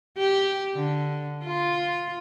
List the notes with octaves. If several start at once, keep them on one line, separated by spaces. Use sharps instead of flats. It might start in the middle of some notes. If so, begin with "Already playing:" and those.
G4
D3
F4